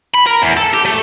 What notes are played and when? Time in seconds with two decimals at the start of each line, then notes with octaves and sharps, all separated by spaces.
0.14 B5
0.26 A#4
0.42 E2
0.57 A4
0.74 G4
0.85 A3